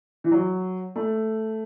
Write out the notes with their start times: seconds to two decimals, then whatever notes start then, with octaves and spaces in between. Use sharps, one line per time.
0.24 E3
0.31 F#3
0.96 A3